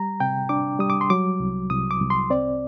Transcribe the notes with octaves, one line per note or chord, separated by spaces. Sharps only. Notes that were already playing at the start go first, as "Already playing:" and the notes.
Already playing: G3 A#5
C3 G5
D4 D6
G3 D#6
D6
C6
F#3 D6
C2
C2 D#6
D6
C2
C6
C4 D5